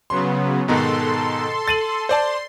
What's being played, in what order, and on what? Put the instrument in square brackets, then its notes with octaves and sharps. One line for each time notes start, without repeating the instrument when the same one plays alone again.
[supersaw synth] C#3 F#3 B3 [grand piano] C6
[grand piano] G#2 B2 D#3 [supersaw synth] A4 C6
[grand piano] A6 D#7 F#7
[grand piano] C5 D5 A5 [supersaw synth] C6